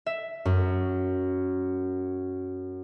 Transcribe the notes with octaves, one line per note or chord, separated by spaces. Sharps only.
E5
F#2